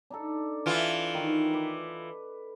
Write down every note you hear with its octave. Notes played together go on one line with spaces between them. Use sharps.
D4 D#4 A4
E3 F4
D#3 C#6
B4 D6